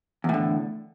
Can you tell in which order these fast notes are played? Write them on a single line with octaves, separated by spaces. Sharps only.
E2 A2 D3